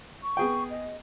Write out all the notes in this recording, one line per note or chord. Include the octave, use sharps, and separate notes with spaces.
C#6
B3 G#4 G5
D#5